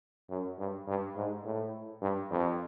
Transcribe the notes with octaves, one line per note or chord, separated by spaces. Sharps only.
F#2
G2
G2
G#2
A2
G2
F2